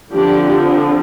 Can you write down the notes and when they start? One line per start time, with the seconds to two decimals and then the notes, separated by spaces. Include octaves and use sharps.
0.14 D3 F3 C4 D4 G4